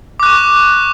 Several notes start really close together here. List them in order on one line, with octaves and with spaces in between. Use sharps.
D6 F#6 C#6